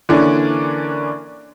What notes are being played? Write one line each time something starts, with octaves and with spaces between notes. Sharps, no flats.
D3 E3 A#3 C#4 D4